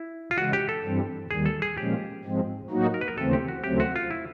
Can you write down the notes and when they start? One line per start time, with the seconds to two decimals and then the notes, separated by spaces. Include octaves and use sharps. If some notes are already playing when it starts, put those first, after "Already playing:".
Already playing: E4
0.31 F4
0.38 C#3 E3 G#3 F#4
0.53 G4
0.69 A4
0.83 G2 E3 G3 C4
1.31 D#2 D#3 G3 G#4
1.46 A4
1.62 G#4
1.77 A#2 F3 G#3 C#4 G4
2.24 G#2 F3 G#3 C4
2.70 A2 F#3 A#3 D#4 F#4
2.94 A#4
3.01 B4
3.08 A#4
3.18 D#2 C#3 E3 A3 C4 A4
3.33 G4
3.48 F#4
3.64 D#2 C#3 F#3 A3 C4 G4
3.80 F#4
3.96 F4
4.11 E4